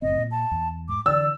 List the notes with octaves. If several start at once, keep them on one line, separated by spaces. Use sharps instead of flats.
F#1 A2 C4 D#5
A#2
A5
E2
G#2 D6
D3 E3 D5 E6